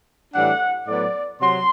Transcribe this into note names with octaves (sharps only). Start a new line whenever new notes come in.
A2 E3 G3 D4 F#5
A2 F#3 B3 D5
C3 F#3 C6